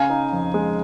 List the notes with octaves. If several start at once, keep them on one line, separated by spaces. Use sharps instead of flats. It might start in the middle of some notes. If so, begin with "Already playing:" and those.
Already playing: C#3 F5 G#5
D#4
F2
G#3